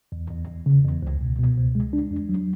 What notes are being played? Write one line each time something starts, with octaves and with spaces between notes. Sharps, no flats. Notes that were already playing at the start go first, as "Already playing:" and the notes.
E2
E2
E2
C#3
E2
C#2
B2
B2
C#2
G#3
D4
E2
F#3